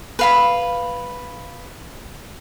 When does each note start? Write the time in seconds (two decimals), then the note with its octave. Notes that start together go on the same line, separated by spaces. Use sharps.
0.19 B4 F5 B5